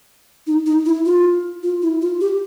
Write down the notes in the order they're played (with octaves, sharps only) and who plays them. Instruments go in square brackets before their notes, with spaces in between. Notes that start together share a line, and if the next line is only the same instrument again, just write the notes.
[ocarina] D#4
D#4
E4
F4
F4
E4
F4
G4